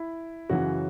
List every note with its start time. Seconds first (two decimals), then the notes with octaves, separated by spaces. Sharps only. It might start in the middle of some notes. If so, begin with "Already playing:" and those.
Already playing: E4
0.49 F#2 C#3 E3 F#4